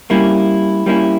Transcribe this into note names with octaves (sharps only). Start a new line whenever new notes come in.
G3 A#3 C#4 E4
G3 A#3 C#4 E4